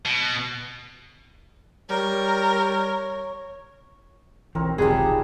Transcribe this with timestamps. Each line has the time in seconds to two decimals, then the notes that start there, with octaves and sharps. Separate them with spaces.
0.05 B2
1.90 G3 A#4 C#5
4.55 B1 E3 C4 A#4 C#5
4.78 E1 B1 C3 D#3 F3 G3 G#4 B4